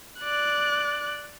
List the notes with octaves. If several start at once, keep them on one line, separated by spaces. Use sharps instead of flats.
D5 F#6